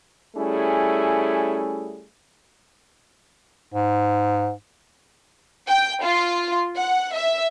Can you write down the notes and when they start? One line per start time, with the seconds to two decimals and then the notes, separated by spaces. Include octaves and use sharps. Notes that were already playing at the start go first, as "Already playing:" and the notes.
0.36 G3 A3 C#4 E4 G#4
3.74 G#2
5.67 G5
6.03 F4
6.77 F#5
7.14 E5